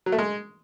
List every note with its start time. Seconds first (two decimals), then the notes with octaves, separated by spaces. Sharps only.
0.06 F#3
0.12 A3
0.18 G#3